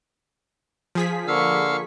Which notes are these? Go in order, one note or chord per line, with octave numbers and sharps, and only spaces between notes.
F3 G#4 B6
D3 A#3 F5 C#6 E6 F6